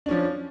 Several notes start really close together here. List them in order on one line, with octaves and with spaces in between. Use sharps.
D4 C#4 F3